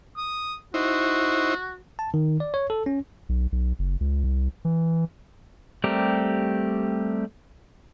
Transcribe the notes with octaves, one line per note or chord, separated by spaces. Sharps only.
D#6
D#4 E4 F#4 C5
A5
D#3
D5
C#5
A4
C#4
B1
B1
F#1
C#2
C2
E3
G3 A3 C4 G4 A#4